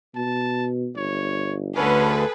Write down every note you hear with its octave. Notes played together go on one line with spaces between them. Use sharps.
B2 A5
G1 C#5
D2 D3 C#4 G#4 A4 B4